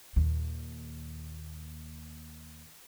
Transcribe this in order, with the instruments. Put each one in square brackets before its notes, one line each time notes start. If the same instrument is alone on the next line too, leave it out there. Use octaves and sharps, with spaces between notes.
[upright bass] D#2 A#2